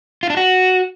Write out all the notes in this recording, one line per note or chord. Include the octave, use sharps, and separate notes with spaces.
F4
D4
F#4